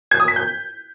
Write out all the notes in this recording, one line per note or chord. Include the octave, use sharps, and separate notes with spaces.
G#6
D#6
B6
G6